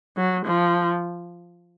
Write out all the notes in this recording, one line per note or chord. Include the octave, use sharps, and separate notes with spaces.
F#3
F3